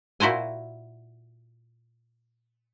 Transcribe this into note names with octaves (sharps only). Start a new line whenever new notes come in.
A#2 E4 F#4 C5 G#5